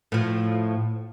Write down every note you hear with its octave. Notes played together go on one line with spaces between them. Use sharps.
A2 F3